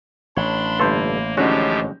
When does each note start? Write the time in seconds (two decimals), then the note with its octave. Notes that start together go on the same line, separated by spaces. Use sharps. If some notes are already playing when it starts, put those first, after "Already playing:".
0.37 A1 D4 C#5 B5 C6
0.79 G1 A#3 A4 B4 C6 G6
1.37 A2 D3 F3 G#3 C#4 D#4 F#4 G4